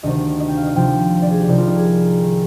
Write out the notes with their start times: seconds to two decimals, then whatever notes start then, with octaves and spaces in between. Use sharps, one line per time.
0.03 D2 C3 D#3 D#5
0.40 D#5
0.48 G5
0.57 F5
0.66 D#5
0.75 D2 C3 F3 G5
1.21 D5
1.30 G#4
1.40 G4
1.48 C2 C3 F3 D#4
1.58 F4
1.67 D#4
1.76 G#4
1.85 A#4
2.22 D#3